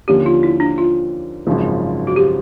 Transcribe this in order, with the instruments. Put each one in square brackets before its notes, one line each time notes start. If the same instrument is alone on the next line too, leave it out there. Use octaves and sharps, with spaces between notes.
[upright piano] D#2 D3 F3 A#3 C#4 [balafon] G4
[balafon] F4
E4
D4
F4
[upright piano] G#1 F#2 C#3 F3
[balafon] F#4
G4